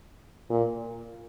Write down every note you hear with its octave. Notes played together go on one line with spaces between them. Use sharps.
A#2